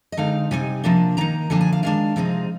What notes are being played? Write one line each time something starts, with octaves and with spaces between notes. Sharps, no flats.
D#5
D3 G#3 C4 D#4 F5
C3 G3 C4 D#4 G#5
C3 F3 A#3 D4
D#3 A#3 D#4 A#5
D3 F3 A#3 D4 G#5
G#5
F5
D#3 G#3 D4 F5
C3 F3 G#3 C4 D#4